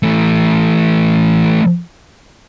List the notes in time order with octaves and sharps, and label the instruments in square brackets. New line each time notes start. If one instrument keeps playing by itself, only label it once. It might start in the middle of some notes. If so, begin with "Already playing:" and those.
[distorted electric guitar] E3 A3